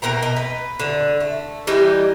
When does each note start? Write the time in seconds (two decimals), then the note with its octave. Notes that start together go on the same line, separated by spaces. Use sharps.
0.02 B2 A#4 G5 A#5
0.22 D#5
0.36 B4
0.79 D3
1.20 A3
1.67 E3 G3 D#4